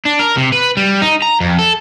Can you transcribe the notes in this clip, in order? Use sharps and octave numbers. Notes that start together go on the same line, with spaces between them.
D4
A#4
C3
B4
G3
D#4
A#5
F2
A4